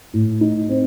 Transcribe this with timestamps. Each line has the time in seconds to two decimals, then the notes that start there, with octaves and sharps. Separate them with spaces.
0.14 A2
0.41 D#4
0.69 C4